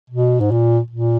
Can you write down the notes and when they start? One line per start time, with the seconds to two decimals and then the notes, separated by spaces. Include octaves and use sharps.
0.10 B2
0.40 G#2
0.51 A#2
0.90 A#2